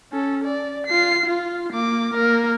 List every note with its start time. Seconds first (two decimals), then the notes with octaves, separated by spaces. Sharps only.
0.12 C#4 A4
0.44 D5
0.87 F4 C7
1.26 F4
1.73 A#3 D6
2.14 A#3 A#4